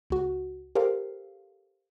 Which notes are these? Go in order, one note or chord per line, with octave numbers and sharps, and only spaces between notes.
C#2 F#4
G4 A4 A#4 C5 F5